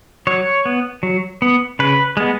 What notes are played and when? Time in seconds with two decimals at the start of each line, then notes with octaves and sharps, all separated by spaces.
0.27 F#3 C#5
0.65 B3
1.03 F#3
1.42 B3
1.79 C#3 B4
2.17 G#3 B3